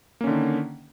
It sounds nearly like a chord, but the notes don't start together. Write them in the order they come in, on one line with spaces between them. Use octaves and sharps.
A#3 C#4 D3 D#3